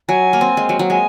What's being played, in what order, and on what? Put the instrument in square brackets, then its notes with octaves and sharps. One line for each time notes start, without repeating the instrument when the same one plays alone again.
[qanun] F#3 [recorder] G#5
[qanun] A#3
C4
G#3
F#3
F#3
[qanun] G#3 [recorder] G#5